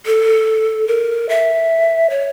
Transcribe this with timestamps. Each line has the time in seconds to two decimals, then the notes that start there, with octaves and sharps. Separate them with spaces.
0.06 A4
0.88 A#4
1.29 E5
2.10 C#5